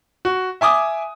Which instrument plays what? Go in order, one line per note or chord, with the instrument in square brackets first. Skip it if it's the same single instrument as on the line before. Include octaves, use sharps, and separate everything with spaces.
[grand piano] F#4
E5 G#5 D6 D#6